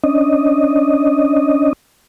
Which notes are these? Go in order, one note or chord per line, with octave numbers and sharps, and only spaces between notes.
C#4 D4 D#5